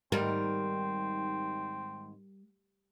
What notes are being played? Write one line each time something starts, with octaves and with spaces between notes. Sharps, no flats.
G#2 D#3 G3 C4 A#4